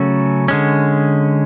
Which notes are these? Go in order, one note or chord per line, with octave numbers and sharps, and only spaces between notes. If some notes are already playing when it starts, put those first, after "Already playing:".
Already playing: C#3 F#3 A3 C#4 F#4 A4
D3 G#3 C#4